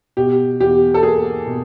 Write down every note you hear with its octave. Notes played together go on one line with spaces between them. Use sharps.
B2 G4
E2 G4
A4
A#3 G#4
B2